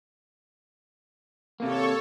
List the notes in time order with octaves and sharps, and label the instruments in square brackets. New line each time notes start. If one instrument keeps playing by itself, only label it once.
[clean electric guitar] C3 A#3 [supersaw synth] A4 C#5